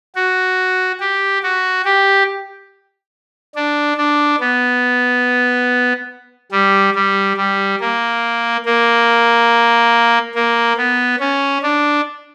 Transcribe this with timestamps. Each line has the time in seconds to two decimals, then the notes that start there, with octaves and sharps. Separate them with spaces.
0.15 F#4
1.00 G4
1.43 F#4
1.85 G4
3.55 D4
3.97 D4
4.40 B3
6.52 G3
6.95 G3
7.37 G3
7.80 A#3
8.65 A#3
10.35 A#3
10.77 B3
11.20 C#4
11.63 D4